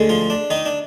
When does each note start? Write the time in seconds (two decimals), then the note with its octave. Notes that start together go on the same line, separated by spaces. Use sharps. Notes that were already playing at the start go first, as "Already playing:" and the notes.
Already playing: D2 D3 G#3
0.09 F3 F4
0.30 D4
0.50 D#3 D#4
0.66 D4